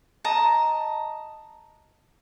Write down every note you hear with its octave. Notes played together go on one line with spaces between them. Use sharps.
D#5 A5 A#5